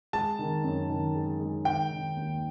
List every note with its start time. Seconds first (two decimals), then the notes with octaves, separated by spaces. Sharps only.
0.13 G#3 A5
0.39 D#3
0.64 F#2
0.89 D#3
1.15 G#3
1.40 G#3
1.65 D#3 G5
1.91 D#3
2.16 D#2